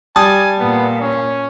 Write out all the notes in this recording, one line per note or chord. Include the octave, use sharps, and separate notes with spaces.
G3 G#5 A5 D#6
A#2 B3
C#4